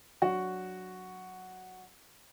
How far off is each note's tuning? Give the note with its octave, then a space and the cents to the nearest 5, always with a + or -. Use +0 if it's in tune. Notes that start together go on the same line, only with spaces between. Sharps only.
F#3 +0 D4 +0 F#4 +0